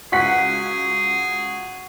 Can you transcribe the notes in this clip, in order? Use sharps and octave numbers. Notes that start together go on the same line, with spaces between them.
C#2 F#4 G#4 F#5 B6